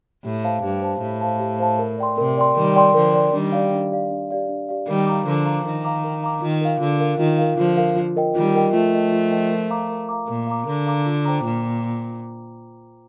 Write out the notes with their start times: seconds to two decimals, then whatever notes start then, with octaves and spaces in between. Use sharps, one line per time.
0.24 A2 G4
0.44 C5 F5 A5
0.63 G2 G4
0.82 C5 F5 A5
1.02 A2 G4
1.21 C5 F5 A5
1.40 G4
1.60 C5 F5 A5
1.79 A#4
1.98 D5 G5 C6
2.18 C3 A#4
2.38 D5 G5 C6
2.56 D#3 G3 A#4
2.76 D5 G5 C6
2.94 D3 F3 A#4
3.14 D5 G5 C6
3.33 D#3 G3 D4
3.52 G4 D5 F5
3.72 D4
3.91 G4 D5 F5
4.11 D4
4.31 G4 D5 F5
4.49 D4
4.69 G4 D5 F5
4.88 D#3 G3 A#4
5.07 F5 A#5 D6
5.26 D3 F3 A#4
5.46 F5 A#5 D6
5.65 D#3 A#4
5.85 F5 A#5 D6
6.04 A#4
6.23 F5 A#5 D6
6.42 D#3 F4
6.61 A#4 F5
6.80 D3 F4
7.00 A#4 F5
7.19 D#3 F4
7.38 A#4 F5
7.57 D3 F3 F4
7.77 A#4 F5
7.96 F4
8.17 A#4 D#5 G5
8.35 D#3 G3 F4
8.55 A#4 D#5 G5
8.73 F3 A3 F4
8.93 A#4 D#5 G5
9.12 F4
9.31 A#4 D#5 G5
9.51 A#4
9.70 F5 A#5 D6
9.90 A#4
10.09 F5 A#5 D6
10.28 A#2 A#4
10.47 F5 A#5 D6
10.66 D3 A#4
10.87 F5 A#5 D6
11.06 F4
11.25 C5 G5 A#5 D6
11.44 A#2 F4